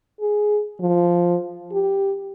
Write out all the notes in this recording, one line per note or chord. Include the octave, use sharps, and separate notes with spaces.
G#4
F3
G4